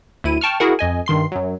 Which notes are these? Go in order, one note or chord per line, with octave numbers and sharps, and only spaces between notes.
D2 E4 D#7
G5 A5 C#6 F6
E4 F#4 G#4 A#4 F#5
F2 D#5 G#5
G2 D#3 C6 C7
F#2 F#3